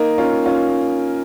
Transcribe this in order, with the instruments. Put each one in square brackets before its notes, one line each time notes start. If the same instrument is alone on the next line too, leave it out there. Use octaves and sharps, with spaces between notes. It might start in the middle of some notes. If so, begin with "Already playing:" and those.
Already playing: [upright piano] A#3 D#4
C#4 F4
C#4 F4